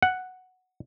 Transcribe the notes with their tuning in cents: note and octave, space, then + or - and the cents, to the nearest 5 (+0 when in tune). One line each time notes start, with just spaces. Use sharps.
F#5 +0